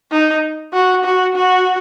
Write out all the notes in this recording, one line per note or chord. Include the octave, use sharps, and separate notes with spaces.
D#4
F#4
F#4
F#4